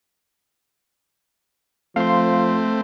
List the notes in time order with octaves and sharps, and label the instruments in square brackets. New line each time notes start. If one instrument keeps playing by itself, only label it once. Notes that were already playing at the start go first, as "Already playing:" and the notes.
[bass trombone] F3 [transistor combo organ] A3 C4 [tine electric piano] F5 C6